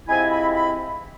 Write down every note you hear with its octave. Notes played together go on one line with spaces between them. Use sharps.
C3 F3 G#3 C4 E4 G#5
B5
B5